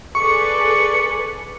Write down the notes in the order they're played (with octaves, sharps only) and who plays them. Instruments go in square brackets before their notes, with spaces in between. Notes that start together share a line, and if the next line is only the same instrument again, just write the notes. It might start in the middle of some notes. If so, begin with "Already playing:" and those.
[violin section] G#4 A4 B4 [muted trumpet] D5 [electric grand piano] C#6 [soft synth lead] C#7